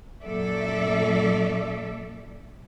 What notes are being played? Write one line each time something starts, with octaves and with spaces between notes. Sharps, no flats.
F#2 A#2 A4 D5 E5